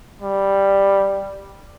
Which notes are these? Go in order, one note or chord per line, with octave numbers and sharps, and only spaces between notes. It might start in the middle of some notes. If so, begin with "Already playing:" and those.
G3